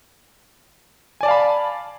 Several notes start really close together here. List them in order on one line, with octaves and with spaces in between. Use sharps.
G#5 D5 A5 F5 B5